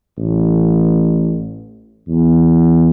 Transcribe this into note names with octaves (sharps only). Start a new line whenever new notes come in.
A1
E2